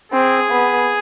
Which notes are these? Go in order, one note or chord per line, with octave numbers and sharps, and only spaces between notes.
C4 G#4
B3